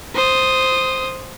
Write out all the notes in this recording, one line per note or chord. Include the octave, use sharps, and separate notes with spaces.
C5 D#6